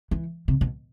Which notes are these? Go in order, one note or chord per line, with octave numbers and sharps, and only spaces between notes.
E3
C3
B2